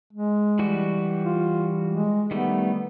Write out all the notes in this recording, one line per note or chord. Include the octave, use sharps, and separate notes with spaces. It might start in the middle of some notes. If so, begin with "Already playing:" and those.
G#3
E3 G3 F#4
F4
G#3
D#3 G3 A3 B3